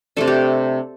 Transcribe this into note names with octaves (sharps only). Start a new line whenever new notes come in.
C3 A3 D4 A4
G4